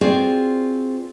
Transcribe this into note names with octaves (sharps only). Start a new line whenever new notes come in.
C4 F4 F#4 G#4 C5 D5